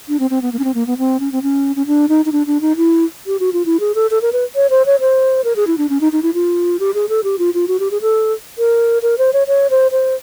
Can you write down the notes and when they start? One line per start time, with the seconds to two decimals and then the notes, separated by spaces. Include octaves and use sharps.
0.08 D4
0.20 C4
0.30 C4
0.42 B3
0.52 A#3
0.59 C#4
0.64 C4
0.74 A#3
0.87 B3
0.98 C4
1.20 C#4
1.32 C4
1.43 C#4
1.76 C#4
1.87 D4
2.09 D#4
2.25 D#4
2.32 D4
2.47 D4
2.61 D#4
2.76 E4
3.27 G4
3.40 F#4
3.53 F4
3.66 E4
3.80 G#4
3.95 A4
4.11 A4
4.22 A#4
4.33 B4
4.55 C#5
4.70 C5
4.86 C#5
5.00 C5
5.44 A#4
5.56 G#4
5.67 E4
5.78 D4
5.89 C#4
6.01 D#4
6.12 D#4
6.23 E4
6.34 F4
6.80 G4
6.94 G#4
7.09 A4
7.24 G4
7.39 F4
7.54 F4
7.68 F#4
7.80 G4
7.91 G#4
8.01 A4
8.58 A#4
9.02 A#4
9.18 C5
9.33 C#5
9.48 C#5
9.70 C5
9.92 C5